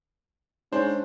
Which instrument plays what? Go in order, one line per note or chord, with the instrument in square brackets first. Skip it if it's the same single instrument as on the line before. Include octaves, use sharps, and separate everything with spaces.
[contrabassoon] G#2 [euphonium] C#4 [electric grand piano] D4 C5